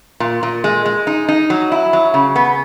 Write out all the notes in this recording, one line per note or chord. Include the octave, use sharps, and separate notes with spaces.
A#2
A#2
G#3
G#3
D#4
D#4
F#3
E4
F#3
C#3
B3